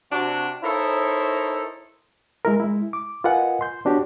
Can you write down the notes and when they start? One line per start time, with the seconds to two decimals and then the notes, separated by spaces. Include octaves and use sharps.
0.11 C3 D4 F#4
0.64 D#4 E4 A4 A#4 C5 C#5
2.45 G#3 E4 A#4
2.60 G#3 E4
2.93 D6
3.24 F4 A#4 B4 D#5 F#5 G#5
3.61 C6 G6
3.85 B3 D4 F#4 G4 C#5